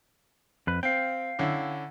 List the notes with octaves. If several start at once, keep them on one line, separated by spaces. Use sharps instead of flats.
F2 B4
C4 F5 G5
D3 C#4 E4